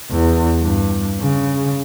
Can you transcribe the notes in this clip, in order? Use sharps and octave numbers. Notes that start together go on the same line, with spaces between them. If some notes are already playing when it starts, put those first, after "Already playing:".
E2
G2
C#3